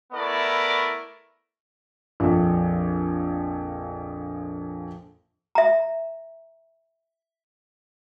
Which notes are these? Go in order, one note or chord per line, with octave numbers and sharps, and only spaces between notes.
A3 B3 E4 A#4 D5
A#1 F2
E5 A#5